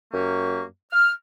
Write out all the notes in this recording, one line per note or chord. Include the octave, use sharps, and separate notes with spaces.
F#2 A#3 G4 C#6
F6